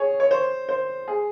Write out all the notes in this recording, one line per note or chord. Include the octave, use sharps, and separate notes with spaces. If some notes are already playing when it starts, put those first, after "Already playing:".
Already playing: G#4 C#5
C#5
C5
C5
G#4